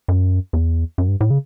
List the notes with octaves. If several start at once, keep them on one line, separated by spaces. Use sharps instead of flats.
F#2
E2
F#2
G2
A2
C#3